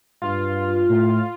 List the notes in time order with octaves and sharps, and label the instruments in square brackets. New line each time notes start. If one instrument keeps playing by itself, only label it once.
[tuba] G2 [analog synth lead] F4
[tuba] A2